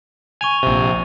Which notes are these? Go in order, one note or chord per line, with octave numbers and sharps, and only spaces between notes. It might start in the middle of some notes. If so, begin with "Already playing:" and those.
G#5 C#6 D#7 F7
A#1 C3